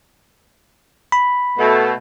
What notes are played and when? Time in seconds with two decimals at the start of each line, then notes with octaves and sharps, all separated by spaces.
1.12 B5
1.58 B2 A3